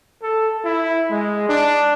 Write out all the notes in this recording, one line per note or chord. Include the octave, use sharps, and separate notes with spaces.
A4
E4
G#3
D4